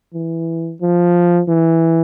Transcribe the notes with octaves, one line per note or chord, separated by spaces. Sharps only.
E3
F3
E3